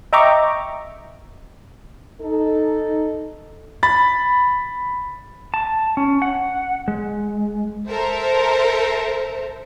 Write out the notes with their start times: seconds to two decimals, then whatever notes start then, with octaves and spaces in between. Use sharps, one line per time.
0.13 D#5 E5 G5 A#5 C#6 D6
2.21 D#4 A4
3.83 B5 A6
5.54 A5
5.97 C#4
6.22 F#5
6.88 G#3
7.89 A4 A#4 C5 E5